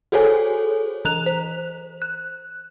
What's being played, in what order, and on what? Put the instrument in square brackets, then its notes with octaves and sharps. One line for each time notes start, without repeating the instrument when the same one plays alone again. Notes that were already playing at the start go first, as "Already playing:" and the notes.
[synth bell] F#4 G#4 A4 C5 C#5 G#5
E3 A#5 F#6 F7
C5
F#6